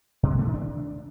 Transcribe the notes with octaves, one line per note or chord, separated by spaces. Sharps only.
B2
G#3
A3
D#3
D4